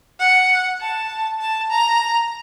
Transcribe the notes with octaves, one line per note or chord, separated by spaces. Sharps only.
F#5
A5
A5
A#5